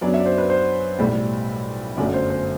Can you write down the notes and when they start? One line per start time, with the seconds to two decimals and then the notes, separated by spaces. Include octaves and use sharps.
0.01 F#2 F#3 B3 D4 D5
0.14 E5
0.20 D5
0.26 C5
0.38 B4
0.50 C5
0.99 B1 A2 G3
1.97 G1 F#2 F#3 A3 D5
2.14 C5
2.30 C5